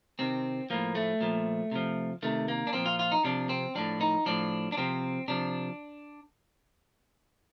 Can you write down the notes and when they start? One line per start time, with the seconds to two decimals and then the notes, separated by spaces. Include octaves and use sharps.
0.19 C3 D#3 C4
0.70 A2 F3 A#3
0.95 A3
1.21 A#2 F3
1.72 C3 F3
2.23 C3 D#3 A3
2.48 A#3
2.67 D4
2.73 A#2 F3 C4
2.86 F4
2.99 F4
3.12 D#4
3.24 C3 F3 D4
3.49 C4
3.75 A2 F3 D4
4.01 D#4
4.26 A2 F3 D4
4.72 D4
4.77 C3 F3 C4
5.28 C3 F3 D4